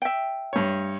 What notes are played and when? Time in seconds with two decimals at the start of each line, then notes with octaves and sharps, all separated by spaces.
0.02 E5 G5
0.53 G2 C#5